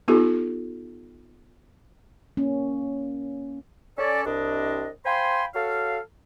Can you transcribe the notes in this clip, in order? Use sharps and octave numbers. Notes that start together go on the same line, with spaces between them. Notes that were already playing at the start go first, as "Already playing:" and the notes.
B3 D#4 F4 G4 A4
A#3 C#4
C#4 A4 D5
C2 D4 D#5
C5 F5 G5 G#5 B5 C6
F#4 A4 C#5 F5